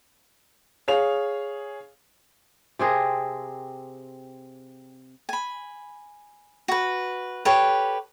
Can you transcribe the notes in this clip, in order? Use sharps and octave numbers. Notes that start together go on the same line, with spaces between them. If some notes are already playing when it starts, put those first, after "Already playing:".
G#4 C#5 F5 F7
C3 C4 G#4 A#4
G#5 B5
F#4 B4
G4 A4 B4 C#5